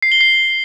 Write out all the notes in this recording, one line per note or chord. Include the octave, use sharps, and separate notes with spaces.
C7
G7
C7